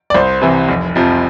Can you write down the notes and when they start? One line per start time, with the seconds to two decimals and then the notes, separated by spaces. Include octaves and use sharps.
0.10 D5
0.14 C2 C5
0.42 C3 E3
0.69 F1
0.95 F2 C3 F3